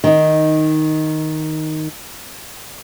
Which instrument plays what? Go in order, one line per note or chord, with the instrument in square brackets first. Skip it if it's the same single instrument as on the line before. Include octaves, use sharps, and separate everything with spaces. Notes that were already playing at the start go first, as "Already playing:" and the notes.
[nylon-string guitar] D#3 D#4